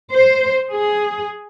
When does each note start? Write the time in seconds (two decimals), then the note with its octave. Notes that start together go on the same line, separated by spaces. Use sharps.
0.12 C5
0.71 G#4